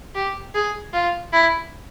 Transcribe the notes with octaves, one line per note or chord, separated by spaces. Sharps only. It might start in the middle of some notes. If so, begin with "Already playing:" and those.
G4
G#4
F4
E4